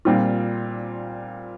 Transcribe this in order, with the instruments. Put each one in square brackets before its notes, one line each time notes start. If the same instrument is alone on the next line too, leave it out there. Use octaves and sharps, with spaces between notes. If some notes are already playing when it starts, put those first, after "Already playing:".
[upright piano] A#2 G3 C4 F4